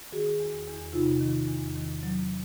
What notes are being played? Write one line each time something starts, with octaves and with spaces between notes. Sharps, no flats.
D#3 F#4 G#4
E2
E2
C3 D#4 F4
D#3
E2
D#3
F#3